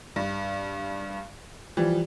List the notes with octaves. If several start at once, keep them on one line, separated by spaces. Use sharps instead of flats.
G2
E3 F3 G3